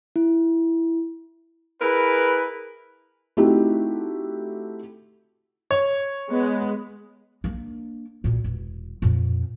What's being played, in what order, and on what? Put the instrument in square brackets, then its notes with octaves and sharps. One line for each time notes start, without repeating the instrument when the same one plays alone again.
[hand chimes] E4
[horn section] E4 G#4 A#4 B4
[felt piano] A3 C4 D#4 E4 F#4 G4
[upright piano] C#5
[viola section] G#3 B3
[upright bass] A#3 D4
D2 A#2
E1
F2 A#2